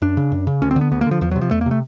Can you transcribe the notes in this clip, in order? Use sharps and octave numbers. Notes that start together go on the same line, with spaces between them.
F#2 D4
C#3
F#2
C#3
D2 C#4
C4
D3
B3
D2 B3
A#3
D3 F3
E2 F3
F#3
C3
F3
E2 A3
A#3
C3 A3